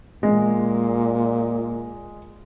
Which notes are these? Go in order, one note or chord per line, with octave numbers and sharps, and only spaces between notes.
A#2 G#3